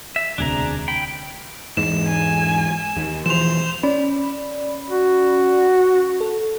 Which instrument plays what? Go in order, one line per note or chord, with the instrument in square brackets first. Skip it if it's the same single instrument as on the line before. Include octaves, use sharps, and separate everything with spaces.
[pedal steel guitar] E5
[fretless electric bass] E1 D2 C3 [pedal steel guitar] D4 G#4 A#5
[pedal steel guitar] G5 B5
[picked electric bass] E2 G#2 [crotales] E7
[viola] G#5
[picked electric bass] D#2
[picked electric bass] E1 E3 F3 [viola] C5 [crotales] E7 F7
[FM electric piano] C#4 D5 B5
[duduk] F#4
[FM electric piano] A4